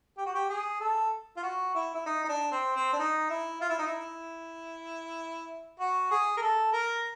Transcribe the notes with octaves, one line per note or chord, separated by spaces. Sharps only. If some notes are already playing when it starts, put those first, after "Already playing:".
G4
F#4
G4
G#4
A4
F4
F#4
E4
E4
D#4
D#4
D4
C4
C4
D4
D#4
E4
F4
E4
D#4
E4
F#4
G#4
A#4
A4
A#4